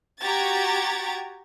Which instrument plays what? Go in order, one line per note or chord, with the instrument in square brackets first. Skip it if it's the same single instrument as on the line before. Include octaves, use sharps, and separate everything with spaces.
[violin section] F#4 G4 A#5 G#6 A6